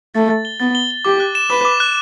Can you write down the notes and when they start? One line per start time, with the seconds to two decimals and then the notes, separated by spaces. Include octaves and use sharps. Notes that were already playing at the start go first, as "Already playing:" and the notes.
0.15 A3 A6
0.30 A6
0.45 G7
0.60 B3 A6
0.75 G7
0.91 G7
1.05 G4 D6
1.20 F#6
1.35 E7
1.50 B4 D6
1.65 D6
1.80 F#6